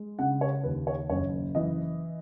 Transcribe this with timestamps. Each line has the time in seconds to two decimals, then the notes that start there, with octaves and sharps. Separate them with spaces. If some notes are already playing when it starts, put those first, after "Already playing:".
Already playing: G#3
0.19 C#3 F#5
0.41 C#5
0.63 D#2 B4
0.87 C#5
1.09 F#1 C#5
1.55 E3 D#5